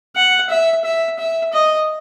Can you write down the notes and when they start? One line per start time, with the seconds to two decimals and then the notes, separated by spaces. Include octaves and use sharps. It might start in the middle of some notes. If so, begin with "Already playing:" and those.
0.16 F#5
0.50 E5
0.85 E5
1.19 E5
1.53 D#5